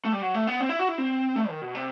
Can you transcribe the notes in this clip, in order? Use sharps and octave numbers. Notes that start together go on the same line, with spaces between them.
A3
G3
F#3
A3
B3
C4
E4
F#4
E4
C4
A3
D#3
B2
C3